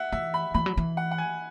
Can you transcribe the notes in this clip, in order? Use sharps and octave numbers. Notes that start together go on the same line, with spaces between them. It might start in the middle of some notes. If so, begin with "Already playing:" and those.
Already playing: E5 F#5
E3 E5
B5
E3 B5
F#3
E3
F#5
F#5
G#5